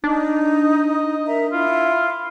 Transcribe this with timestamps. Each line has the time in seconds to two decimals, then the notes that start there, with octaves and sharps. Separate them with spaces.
0.04 D4 D#4
0.61 D#5
1.27 A#4 E5 A#5
1.52 E4 F4